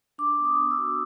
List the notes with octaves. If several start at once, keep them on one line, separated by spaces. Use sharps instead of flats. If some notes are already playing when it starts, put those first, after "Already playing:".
D4 D6
B3
D#6
B3
E6
F#4